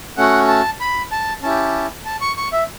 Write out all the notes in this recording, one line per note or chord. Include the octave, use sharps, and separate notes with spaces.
A3 C#4 F#4 F#5
A5
B5
A5
C#4 E4 G4 A5
A5
C#6
C#6
E5